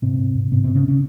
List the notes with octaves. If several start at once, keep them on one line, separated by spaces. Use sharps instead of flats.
G#2 C3 C4
G#2
G#2
G#2 C3 C4
G#2 C3 C4
C#3 C#4
C#3 C#4